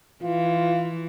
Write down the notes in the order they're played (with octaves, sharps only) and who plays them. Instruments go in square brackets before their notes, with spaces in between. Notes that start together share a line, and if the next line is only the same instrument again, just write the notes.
[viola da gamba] E3 [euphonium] F4